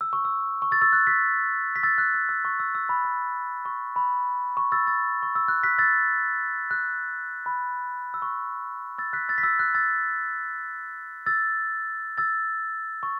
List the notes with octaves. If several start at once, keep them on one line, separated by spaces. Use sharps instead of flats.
E6
C#6
E6
C#6
E6 A6
E6 A6
F#6
F#6 B6
B6
E6 A6
F#6
E6
E6
C#6
E6
E6
B5
B5
C#6
B5
C#6
E6 A6
E6 A6
C#6
E6
F#6
F#6 B6
E6 A6
F#6
B5
E6
C#6
E6 A6
F#6 B6
E6 A6
B6
E6 A6
F#6
E6 A6
E6 A6
E6 A6
C#6